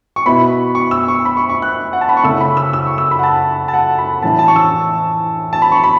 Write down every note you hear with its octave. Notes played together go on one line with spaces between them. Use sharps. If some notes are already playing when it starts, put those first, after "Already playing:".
C#6
B2 B3 E4 B5
C#6
E6
C#6
B5
C#6
C#6
F#6
F#5
A5
B5
C#6
C#3 A3 E4 E6
B5
E6
E6
C#6
E6
B5
F#5
A5
A5
F#5
B5
A2 E3 C#4 E4 A5
A5
C#6
E6
A5
B5
C#6
B5